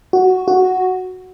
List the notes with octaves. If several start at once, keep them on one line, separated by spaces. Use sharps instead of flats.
F#4
F#4